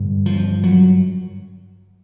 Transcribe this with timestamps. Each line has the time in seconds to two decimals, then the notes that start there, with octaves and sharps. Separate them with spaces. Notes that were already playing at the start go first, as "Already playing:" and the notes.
Already playing: G2 D3
0.26 F3
0.63 F#3